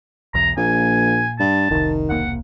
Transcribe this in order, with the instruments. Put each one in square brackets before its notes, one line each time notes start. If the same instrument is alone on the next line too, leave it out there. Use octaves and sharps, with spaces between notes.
[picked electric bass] B1 E2 [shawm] A#5
[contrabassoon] A#1 [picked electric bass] A#2 [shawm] G#5
[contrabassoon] G2 [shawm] A5
[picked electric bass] F1 C2 [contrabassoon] D#3
[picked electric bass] E1 C2 A#3 [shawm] F#5